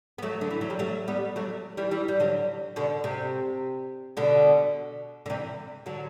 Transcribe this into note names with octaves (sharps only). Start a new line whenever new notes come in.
B3
F#3 A3
D3
E3
F#3
G3
F#3 A3
G3 B3
F#3 A3
E3 G3
E3 G3
G3
D3 F#3
B2 D3
C3
B2 D3
D3
C3 E3
D3 F#3